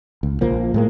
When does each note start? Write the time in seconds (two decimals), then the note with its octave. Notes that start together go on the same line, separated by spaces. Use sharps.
0.23 C#2
0.41 A#1 F3 A#3
0.74 A2 G#3 A#3